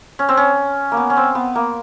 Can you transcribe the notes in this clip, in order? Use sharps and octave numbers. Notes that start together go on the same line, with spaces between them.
C#4
C4
C#4
A#3
B3
C#4
C4
B3
A#3